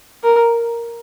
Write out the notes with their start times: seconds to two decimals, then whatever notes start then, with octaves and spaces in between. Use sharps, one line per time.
0.23 A#4